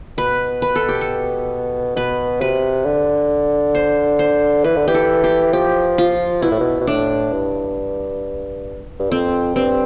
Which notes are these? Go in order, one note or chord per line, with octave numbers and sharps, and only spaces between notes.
B2 B4
B4
A4
G4
A4
B2 B4
C3 B4
D3
C5
C5
E3 B4
D3
E3 G4
A4
G4
F3 G4
F4
B2 E4
A2
B2
B2
A2 D4
G2
G2
F2 C4
G2 C4